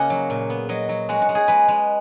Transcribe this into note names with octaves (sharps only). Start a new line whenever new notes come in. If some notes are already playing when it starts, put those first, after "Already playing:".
Already playing: C#3 A#3 C#4 D#5 F#5 G#5
F#3
A#2
B3
F#3 D#5
F#3
G#3 F#4
F#4
G#3
G#4
G#3 B4
G#3